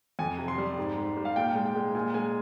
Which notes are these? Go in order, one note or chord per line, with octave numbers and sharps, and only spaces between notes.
F2 G#5
C3
C6
G3
G#2
G#2
G3
F5
A#2 G5
G#3
G5
G#3
A#2 G#5
G#3 G#5